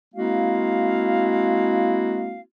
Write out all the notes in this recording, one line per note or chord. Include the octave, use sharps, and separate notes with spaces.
G#3 A#3 C4 E4 F#4 F5